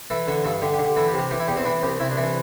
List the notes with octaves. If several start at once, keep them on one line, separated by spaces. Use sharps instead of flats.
E3 A4
D3 A4
G2 A4
D3 G4
G4
D3
G4
E3 A4
G4
C3
G4
E3 G4
E4
E2 G4
C4
E3 D4
C2 G4
C2 E4
D4
E3
D4